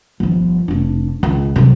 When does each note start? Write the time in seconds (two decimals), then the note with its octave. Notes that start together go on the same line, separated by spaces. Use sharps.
0.20 G1 F3
0.68 F1 D4
1.23 C#2
1.56 C3 F#3